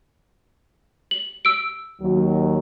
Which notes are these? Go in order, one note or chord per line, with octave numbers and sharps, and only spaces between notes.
F#7
E6 D7
D#2 F#3